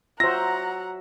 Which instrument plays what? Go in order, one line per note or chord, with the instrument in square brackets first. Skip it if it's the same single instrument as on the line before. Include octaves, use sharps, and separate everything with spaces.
[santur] F#3 E5 [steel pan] F4 C5 [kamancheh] F#5 A#5 [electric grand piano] A#6